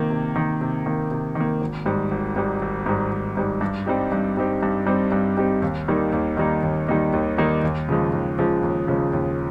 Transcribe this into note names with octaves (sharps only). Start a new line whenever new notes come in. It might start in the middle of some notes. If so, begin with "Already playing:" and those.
Already playing: C3 D#3 A#3
C3
D#3 A#3
C3
D#3 A#3
C3
D#3
A#3
G#1
G#2 G3
G#1
G#2 G3
G#1
G#2 G3
G#1
G#2 G3
G2
G3 C4 D#4 G4
G2
G3 C4 D#4 G4
G2
G3 C4 D#4 G4
G2
G3 C4 D#4 G4
D#2
D#3 G3 A#3 D#4
D#2
D#3 G3 A#3 D#4
D#2
D#3 G3 A#3 D#4
D#2
D#3 G3 A#3 D#4
D#2
C#3 F3 G#3
D#2
C#3 F3 G#3
D#2
C#3 F3 G#3
D#2